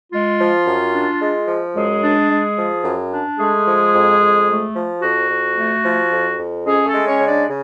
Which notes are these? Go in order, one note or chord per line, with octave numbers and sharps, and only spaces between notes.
G#3 F4
F3
F#2
D4
G#3
F3
F#2 G#3 G#4
D4
G#3
F3
F#2
D4
G#3 A3 G#4
F3
F2
F2
A3
F3
F2 F#4
F2
A3
F3
F2
F2
G#3 C#4 G#4
A3 A4
G#3
C#4 C#5
C#3
D4 D5
C#3